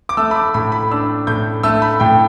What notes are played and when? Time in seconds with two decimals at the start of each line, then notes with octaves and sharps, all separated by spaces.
0.09 D6
0.17 A3 E6
0.31 B5
0.35 D6
0.54 A2 B5
0.72 B5
0.91 D4 E6
1.27 A2 G6
1.63 A3 E6
1.82 B5
2.00 A2 G5